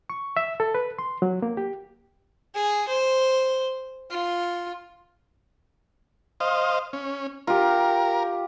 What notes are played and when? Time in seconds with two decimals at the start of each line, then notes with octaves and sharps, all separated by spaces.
0.10 C#6
0.37 E5
0.60 A4
0.75 B4
0.99 C6
1.22 F#3
1.42 A#3
1.57 G4
2.55 G#4
2.88 C5
4.10 F4
6.40 C5 D#5 F5
6.93 C#4
7.47 F4 G4 A#4